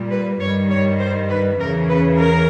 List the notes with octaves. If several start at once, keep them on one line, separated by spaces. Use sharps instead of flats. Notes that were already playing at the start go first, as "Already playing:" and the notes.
Already playing: A#2 G3
B4
G2 D#3 G3 C#5
C#5
C5
B4
E2 C#3 E3 A#4
B4
A#4